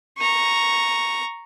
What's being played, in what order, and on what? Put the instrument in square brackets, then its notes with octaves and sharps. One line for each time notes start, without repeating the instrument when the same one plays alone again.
[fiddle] A#5 C#6